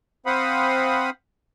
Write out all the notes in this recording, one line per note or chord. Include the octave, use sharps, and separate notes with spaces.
C4 C5 F5 F#5 B5 D#6